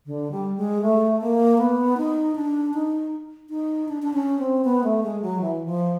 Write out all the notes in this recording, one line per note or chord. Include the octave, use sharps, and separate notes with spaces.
D3
G3
G#3
A3
A#3
B3
D#4
D4
D#4
D#4
D4
D4
C#4
C4
B3
A3
G#3
F#3
E3
F3